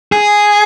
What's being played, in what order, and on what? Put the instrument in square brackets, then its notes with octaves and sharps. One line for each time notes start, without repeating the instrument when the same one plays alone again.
[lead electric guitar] G#4